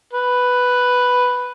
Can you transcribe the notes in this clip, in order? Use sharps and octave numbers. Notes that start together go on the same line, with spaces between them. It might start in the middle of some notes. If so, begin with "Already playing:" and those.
B4